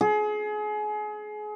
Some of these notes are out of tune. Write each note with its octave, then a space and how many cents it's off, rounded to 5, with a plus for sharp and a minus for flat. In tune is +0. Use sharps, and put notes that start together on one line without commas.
G#4 +30